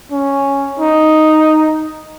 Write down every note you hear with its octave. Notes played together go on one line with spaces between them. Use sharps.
C#4
D#4